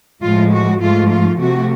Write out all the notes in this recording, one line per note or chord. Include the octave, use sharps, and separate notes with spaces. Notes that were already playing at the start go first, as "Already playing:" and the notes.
A2 F3 G#3 F4
F#4
G#2 F3 A3 F4
F4
C3 F3 A3 F#4